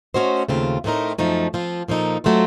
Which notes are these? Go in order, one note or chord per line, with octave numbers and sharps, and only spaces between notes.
A3 C#4 F#4 C5 D#5
D#2 C#3 A3 C4 F4
A2 A3 C4 D#4 A#4
F#2 F3 A3 D#4
F3 C4 F4
A#2 F3 A#3 D#4 A4
F#3 A3 C4 F4